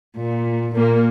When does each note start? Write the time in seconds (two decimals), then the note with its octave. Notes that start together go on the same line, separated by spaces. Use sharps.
0.19 A#2
0.75 A#2 A#3